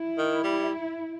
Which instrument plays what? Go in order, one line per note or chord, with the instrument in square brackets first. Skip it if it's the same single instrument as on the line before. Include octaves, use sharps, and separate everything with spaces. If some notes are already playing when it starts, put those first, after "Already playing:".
Already playing: [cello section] E4
[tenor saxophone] D#3
G3